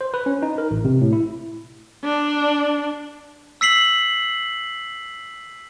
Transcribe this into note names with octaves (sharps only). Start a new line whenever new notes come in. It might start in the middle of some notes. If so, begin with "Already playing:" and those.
C5
B4
C#4
D#4
A#4
A1
C3
A2
E4
D4
E6 B6 C7 F#7